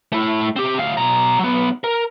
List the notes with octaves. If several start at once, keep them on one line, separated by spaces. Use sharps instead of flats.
A3 E4
C4 G4
D2 F5
B2 A#5
F#3 B3
A#4